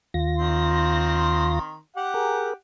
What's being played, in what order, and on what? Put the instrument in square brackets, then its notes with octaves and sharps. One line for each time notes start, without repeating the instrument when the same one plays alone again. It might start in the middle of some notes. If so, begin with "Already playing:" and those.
[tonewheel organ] D#2 F4 A#6
[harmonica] D#3 C4 C6
G4 F#5
[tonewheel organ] G#4 A#4